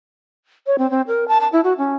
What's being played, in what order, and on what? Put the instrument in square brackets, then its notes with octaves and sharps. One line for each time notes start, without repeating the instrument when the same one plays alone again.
[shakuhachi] C#5
C4
C4
A#4
A5
A5
E4
F#4
C#4